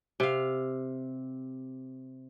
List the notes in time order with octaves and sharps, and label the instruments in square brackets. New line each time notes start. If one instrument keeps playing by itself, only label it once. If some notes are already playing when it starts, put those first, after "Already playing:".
[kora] C3 F5